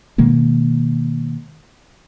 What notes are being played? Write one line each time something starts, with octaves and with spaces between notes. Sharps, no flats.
B2 D#3 G#3 A#3